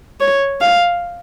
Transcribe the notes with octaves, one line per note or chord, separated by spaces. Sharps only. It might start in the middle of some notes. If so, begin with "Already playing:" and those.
C#5
F5